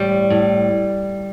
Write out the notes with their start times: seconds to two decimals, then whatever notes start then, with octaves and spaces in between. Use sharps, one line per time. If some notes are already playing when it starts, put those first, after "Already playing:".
Already playing: A2 G3
0.30 A2